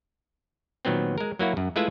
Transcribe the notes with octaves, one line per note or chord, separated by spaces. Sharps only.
A#2 D#3 F#3 B3 C4
G#3 A#4
F#3 A#3 E4 F#4
F#2
G#3 A3 E4 F4 B4 E5